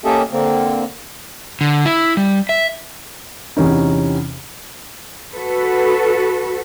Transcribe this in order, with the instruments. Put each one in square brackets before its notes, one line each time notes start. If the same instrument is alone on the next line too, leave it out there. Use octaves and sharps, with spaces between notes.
[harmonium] A#3 C#4 G4 A4 D#5 E5
D3 A#3 C4
[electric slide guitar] D3
E4
G3
E5
[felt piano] E2 C3 E3 C#4 D#4
[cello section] F#4 A4 B4